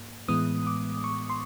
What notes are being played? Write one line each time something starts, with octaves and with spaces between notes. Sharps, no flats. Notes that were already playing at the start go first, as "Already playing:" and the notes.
Already playing: G#2 A#3
A2 E3 G#3 B3 D#6
D6
C#6
C6